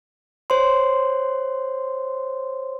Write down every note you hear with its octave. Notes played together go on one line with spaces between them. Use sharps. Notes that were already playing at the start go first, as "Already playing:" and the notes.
C5 C#5 C6